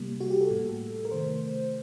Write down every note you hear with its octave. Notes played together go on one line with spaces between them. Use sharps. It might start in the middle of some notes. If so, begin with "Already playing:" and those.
Already playing: C3 G3 A#3
F#4
G4
A4
A2 G3 A#3
A#4
C3 D#3 A3 C5